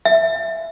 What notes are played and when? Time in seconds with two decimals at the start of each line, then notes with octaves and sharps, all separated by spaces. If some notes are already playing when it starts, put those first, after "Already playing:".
0.05 E5